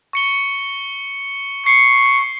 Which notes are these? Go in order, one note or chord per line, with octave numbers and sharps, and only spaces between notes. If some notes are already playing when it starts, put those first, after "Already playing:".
C#6 C#7 G7
C#6 C7